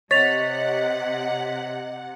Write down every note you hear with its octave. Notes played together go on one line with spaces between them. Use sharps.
C3 C#5 D#5 F#5 A6 B6 F7